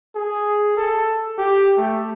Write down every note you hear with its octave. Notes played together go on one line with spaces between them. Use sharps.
G#4
A4
G4
A3